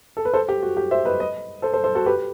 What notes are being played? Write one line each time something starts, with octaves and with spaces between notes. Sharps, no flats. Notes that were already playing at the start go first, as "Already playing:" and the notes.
A4
B4
A4 C5
G4
F#4
G4
C5 E5
B4 D#5
B4 D#5
A4 C5
A4 C5
A4 C5
F#4 A4
G4 B4